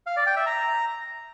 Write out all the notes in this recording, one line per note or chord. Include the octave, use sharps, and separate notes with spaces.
F5
D5
G5
E5
A#5